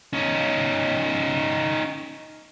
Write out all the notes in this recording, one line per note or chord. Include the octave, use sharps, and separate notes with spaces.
C#4 D#4